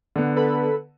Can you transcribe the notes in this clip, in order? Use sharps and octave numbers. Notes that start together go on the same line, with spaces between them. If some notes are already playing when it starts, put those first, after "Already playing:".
D3 B3
A4 B4 B5